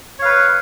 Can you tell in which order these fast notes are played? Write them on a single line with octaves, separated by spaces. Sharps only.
C#5 F5 B4